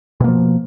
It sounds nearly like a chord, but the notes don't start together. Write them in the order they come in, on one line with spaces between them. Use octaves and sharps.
B2 A#3 F3